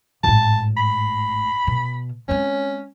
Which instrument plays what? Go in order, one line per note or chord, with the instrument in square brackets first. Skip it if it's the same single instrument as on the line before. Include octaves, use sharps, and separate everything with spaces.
[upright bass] G#1 A2 [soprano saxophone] A5
[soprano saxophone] B5
[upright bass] B2
[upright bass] G#3 C4 [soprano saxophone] C#4